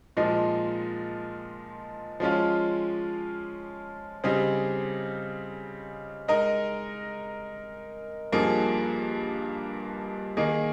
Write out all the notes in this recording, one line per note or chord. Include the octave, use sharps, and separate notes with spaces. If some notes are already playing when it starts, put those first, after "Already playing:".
A#2 F3 G#3 D#4
F3 G#3 C#4 F4
C#3 G3 C4 D#4 G#4
G#3 D#4 A#4 D#5
G2 F3 A#3 D#4 G#4
D#3 A#3 D#4 G#4